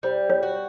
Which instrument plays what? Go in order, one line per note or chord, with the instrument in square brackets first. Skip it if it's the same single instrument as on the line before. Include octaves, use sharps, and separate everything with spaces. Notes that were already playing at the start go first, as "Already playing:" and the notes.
[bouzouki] G3 [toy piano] C5
[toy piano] C#5
[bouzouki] F#4